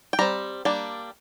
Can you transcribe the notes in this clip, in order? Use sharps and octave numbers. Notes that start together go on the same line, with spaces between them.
G5
G3 C4 A#5
G3 A#3 D4